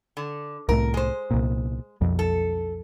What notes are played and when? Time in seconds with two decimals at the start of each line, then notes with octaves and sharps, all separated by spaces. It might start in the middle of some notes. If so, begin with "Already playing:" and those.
0.17 D3
0.69 C2 A2 A#4
0.94 G#3 C5
1.31 C2 A#2
2.01 B1 F2
2.19 A4